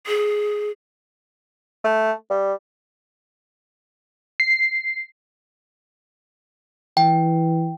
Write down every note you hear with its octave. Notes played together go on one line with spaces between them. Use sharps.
G#4
A3
G3
C7
E3 G5